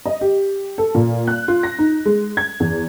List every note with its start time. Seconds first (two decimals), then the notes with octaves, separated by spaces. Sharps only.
0.06 D#5
0.21 G4
0.78 A4
0.95 A#2
1.27 F#6
1.48 F4
1.63 A#6
1.79 D#4
2.06 G#3
2.37 G#6
2.60 E2